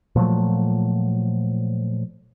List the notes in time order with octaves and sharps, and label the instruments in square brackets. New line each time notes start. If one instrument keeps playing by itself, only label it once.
[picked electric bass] A#2 F3 F#3 A3